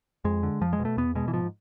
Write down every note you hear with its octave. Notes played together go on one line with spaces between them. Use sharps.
F2 G#3
D3
F2 F3
G#3
B2
A3
E2 B3
B2 G#3
E3
G#2 F3